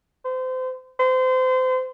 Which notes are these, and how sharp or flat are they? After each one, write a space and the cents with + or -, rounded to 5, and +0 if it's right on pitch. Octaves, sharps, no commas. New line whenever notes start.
C5 -30
C5 -30